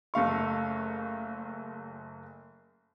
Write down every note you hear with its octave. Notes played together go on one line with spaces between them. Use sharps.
F#1 A3 F5 C#6